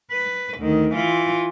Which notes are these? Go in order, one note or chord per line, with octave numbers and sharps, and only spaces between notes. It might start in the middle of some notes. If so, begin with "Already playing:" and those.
B4
D2 D#3
E3 F4